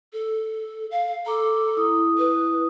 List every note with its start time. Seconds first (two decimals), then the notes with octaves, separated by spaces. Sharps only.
0.13 A4
0.91 F5
1.26 A4 A#5 D6
1.77 E4 D#6
2.18 B4